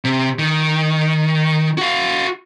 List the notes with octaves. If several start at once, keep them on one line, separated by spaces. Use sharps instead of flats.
C3
D#3
F#4 F5